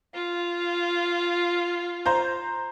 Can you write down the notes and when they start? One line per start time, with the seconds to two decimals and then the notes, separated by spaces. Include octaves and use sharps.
0.15 F4
2.06 C5 A#5 G6